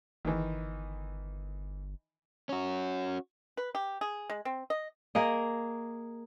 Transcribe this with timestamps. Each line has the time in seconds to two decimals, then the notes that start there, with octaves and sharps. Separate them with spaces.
0.25 G1 D#3 E3
2.49 C#4 F#4
3.57 B4
3.75 G4
4.01 G#4
4.30 G#3
4.45 C4
4.70 D#5
5.15 A#3 G#4 A#4 D#5